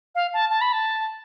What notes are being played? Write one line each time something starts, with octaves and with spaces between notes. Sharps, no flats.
F5
A5
A5
B5
A5